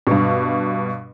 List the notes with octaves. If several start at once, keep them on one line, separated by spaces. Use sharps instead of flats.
G2 B2